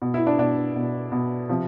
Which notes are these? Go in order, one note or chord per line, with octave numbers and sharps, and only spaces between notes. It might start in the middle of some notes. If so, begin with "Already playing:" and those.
B2
E4
D4
B2 D4
B2
B2
C3 F3